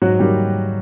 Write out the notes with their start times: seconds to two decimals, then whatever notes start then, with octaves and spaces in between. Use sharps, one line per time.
0.02 G#2 F#3 F#4
0.19 D#3 G3 A#3 G4